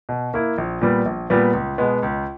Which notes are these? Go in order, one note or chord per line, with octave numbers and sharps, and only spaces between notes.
B2
A#3 E4
A#1
A#2 G3 B3
A#1
A#2 G3 B3
C#2
B2 G#3 B3
C#2